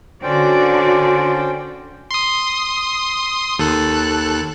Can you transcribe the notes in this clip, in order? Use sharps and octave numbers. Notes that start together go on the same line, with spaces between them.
D3 C#4 F#4 C5 D5 G5
C6 D#6
D#2 A4 F#6